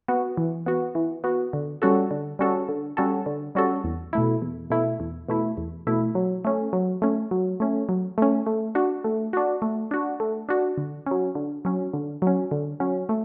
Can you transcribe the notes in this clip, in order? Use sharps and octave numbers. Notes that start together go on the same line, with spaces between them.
B3 F#4
E3
B3 F#4
E3
B3 F#4
D3
G3 C#4 F#4 A4
D3
G3 C#4 F#4 A4
D3
G3 C#4 F#4 A4
D3
G3 C#4 F#4 A4
E2
B2 A3 E4
E2
B2 A3 E4
E2
B2 A3 E4
E2
B2 A3 E4
F#3
A3 C#4
F#3
A3 C#4
F#3
A3 C#4
F#3
A3 C#4
A3
D4 F#4
A3
D4 F#4
A3
D4 F#4
A3
D4 F#4
D3
F#3 C#4
D3
F#3 C#4
D3
F#3 C#4
D3
F#3 C#4
A3